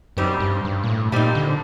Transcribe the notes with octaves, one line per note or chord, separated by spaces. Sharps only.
F#2 G3 C4 D#4
G2
G2
A#2
A2
A#2 G3 C4 D#4
D3